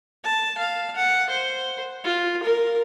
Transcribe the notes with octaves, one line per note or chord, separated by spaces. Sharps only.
A5
F5
F#5
C5
F4
A#4